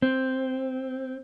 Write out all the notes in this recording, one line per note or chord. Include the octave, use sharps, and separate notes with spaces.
C4